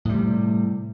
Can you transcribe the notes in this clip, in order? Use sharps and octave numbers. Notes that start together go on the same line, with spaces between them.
A2 C3 G3